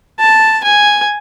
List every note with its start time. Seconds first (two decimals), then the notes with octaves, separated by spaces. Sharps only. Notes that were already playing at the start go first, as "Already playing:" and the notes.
0.19 A5
0.64 G#5